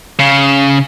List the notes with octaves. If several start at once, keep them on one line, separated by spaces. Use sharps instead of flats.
C#3